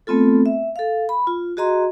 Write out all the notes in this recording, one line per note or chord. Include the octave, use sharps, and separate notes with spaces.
A3 B3 C4 F4 A4
E5
A4 F5
B5
F4
F#4 G#4 D#5 A#5 C6